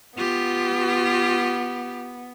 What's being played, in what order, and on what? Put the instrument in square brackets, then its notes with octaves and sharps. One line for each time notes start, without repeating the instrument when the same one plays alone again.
[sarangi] B3 [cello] F4 G4